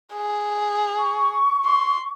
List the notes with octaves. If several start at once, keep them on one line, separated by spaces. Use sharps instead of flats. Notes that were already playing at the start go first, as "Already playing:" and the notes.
G#4
C#6
C6